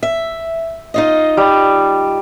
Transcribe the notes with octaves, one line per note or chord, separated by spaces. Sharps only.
E5
D#4 F4 D#5
G3